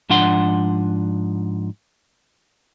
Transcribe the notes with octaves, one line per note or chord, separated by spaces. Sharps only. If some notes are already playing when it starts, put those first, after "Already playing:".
G#2 F3 D4 F#5 C6